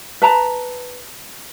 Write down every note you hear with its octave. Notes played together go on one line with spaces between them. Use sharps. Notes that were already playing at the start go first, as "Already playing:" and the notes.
B4 A5 A#5